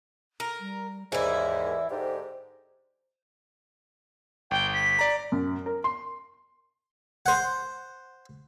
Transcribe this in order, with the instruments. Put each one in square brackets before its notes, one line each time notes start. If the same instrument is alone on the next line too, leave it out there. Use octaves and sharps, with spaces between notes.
[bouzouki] A#4
[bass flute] G3
[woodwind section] D#2 G#2 [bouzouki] E3 E4 [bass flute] D5
[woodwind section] G#2 D3 G4 [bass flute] C5
[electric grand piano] G1 [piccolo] G5
[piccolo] B6
[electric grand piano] D5 A#5
[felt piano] F#2
A#4
C6
[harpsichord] C5 F#5